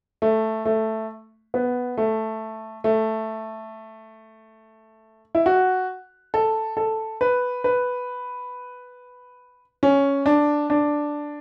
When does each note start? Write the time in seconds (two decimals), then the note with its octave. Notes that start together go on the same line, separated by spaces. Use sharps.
0.22 A3
0.65 A3
1.54 B3
1.97 A3
2.84 A3
5.35 E4
5.46 F#4
6.34 A4
6.77 A4
7.21 B4
7.64 B4
9.83 C#4
10.26 D4
10.70 D4